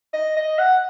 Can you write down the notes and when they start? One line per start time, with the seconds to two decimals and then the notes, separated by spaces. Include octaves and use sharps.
0.14 D#5
0.37 D#5
0.59 F#5